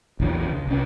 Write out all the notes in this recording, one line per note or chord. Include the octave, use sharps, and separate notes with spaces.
A#1 E2 D3
C#2
C2 C#4